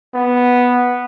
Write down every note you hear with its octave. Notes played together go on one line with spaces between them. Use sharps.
B3